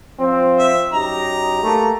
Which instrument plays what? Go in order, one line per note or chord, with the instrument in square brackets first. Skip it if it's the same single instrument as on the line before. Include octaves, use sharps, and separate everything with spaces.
[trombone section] F3 C4
[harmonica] E5
[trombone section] F#2 D#4 G4 [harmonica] A#5
[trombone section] A3 A#3 G4